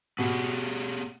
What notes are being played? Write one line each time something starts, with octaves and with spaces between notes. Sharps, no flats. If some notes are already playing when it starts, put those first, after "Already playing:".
B2 B3 G4 G#4